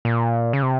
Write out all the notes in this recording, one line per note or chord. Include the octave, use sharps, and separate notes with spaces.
A#2
C#3
C3